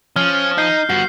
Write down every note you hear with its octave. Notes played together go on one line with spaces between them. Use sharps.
F3 C#4 F6
D#4 G6 C7
G2 B3 F#4 C7